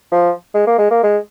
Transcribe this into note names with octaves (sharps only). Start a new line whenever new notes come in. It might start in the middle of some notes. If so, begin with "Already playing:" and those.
F3
G#3
A#3
G#3
A#3
G#3